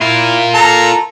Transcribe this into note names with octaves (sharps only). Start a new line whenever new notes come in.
E4 F4 A#4
A4 A#5